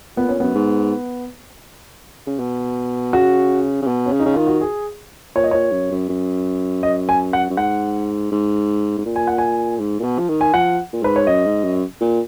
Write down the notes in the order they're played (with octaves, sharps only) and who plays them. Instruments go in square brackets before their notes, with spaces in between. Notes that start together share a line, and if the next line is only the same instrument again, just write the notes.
[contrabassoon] A#2 [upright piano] B3
[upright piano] C#4
[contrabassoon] F#2 [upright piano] B3
[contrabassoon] G#2
C#3
B2
[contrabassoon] C#3 [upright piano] F#4
[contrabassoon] C#3
B2
[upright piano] C#4
[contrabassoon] C#3
[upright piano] D#4
[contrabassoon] C#3
[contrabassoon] D#3 [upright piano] F4
[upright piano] F#4
G#4
[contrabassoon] A#2 [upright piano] C#5
[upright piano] D#5
[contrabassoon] A#2 [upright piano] C#5
[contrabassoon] F#2
F#2
F#2
[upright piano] D#5
G#5
F#5
[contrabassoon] F#2
[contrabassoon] G#2 [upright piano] F#5
[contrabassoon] G#2
G#2
A#2
[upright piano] G#5
F#5
G#5
[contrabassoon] G#2
A#2
B2
F3
D#3
[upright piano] G#5
[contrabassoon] F3 [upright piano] F#5
[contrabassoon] A#2
[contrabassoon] G#2 [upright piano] B4
[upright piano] C#5
[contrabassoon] F#2 [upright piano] D#5
[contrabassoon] G#2
F#2
A#2